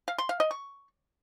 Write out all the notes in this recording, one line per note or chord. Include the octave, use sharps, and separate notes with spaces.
F5
C6
F5
D#5
C#6